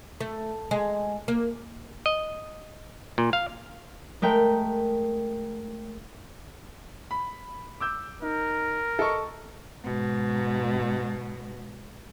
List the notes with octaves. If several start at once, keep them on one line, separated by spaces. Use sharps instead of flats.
A3
G#3
A#3
D#5
A#2
F5
G#3 A3 A#4 G5
B5
D6 E6 G6
D#4 A#4
A4 D#5 C#6
G#2 B2